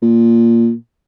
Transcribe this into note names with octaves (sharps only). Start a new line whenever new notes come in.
A#2